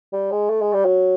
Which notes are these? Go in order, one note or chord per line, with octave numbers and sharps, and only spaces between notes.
G3
G#3
A3
G#3
G3
F#3